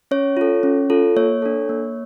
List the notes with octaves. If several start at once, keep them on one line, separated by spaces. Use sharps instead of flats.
C#4 C#5
F4 A4
C#4
F4 A4
A#3 C#5
D4 A4
A#3